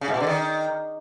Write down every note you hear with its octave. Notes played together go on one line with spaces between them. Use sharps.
C#3
G#2
B2
D3
D#3